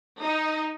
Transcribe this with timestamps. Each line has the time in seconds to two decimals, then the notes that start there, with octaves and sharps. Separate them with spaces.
0.22 D#4